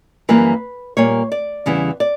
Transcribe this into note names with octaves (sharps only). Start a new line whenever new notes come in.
F#2 E3 G3 A#3 B4
A#2 G3 A#3 C#5
D5
E2 C#3 E3 G3
D5